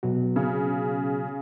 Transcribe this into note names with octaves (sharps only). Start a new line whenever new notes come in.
B2 F#3 F#4
C#3